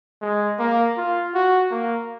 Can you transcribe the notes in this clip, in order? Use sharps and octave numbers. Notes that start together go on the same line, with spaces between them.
G#3
A#3
F4
F#4
A#3